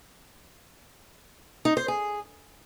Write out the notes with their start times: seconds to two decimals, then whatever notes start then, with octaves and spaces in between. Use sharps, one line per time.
1.65 D#4
1.77 C5
1.88 G#4